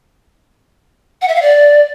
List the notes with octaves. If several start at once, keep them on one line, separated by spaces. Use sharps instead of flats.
F#5
E5
F5
D5